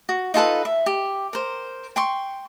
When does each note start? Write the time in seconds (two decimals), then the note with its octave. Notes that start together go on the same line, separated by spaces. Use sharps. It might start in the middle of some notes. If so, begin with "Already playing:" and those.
0.09 F#4
0.34 D#4 F4 A4 B4
0.65 E5
0.86 G4
1.33 A#4 C5
1.96 G5 C6 C#6